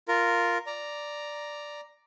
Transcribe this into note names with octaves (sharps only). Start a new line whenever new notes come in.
F4 A#4
D5 A#5